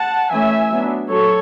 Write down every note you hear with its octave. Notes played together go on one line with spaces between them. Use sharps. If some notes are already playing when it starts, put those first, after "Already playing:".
Already playing: F#5 A5
E3 A3 C#4 E5 G#5
F#3 B3 D4
F#3 A4 C#5